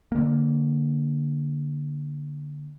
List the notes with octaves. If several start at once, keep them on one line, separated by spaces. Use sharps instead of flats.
D3 A#3